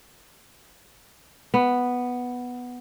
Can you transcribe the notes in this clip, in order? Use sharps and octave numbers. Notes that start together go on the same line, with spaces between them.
B3